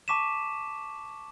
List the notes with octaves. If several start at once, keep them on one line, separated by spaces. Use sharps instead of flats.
A5 C#6 D6 B6 D#7 E7